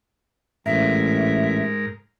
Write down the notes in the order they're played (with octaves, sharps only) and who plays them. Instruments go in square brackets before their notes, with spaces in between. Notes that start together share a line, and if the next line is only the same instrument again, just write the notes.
[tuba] A1 [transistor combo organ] G#2 A#4 [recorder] E5